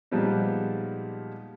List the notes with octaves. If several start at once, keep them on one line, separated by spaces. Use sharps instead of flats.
A#2 F3 G3 G#3 B3 D#4